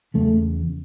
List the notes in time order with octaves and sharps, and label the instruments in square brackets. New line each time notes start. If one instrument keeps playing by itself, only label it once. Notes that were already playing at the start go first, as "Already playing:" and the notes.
[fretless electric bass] E2 C#3 A3